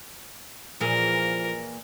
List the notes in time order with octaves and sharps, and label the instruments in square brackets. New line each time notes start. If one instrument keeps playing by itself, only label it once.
[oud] A#2 E3 G#4 [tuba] F3 [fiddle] A#4